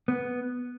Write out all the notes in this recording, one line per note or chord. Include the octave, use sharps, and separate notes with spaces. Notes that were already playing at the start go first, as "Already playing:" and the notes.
B3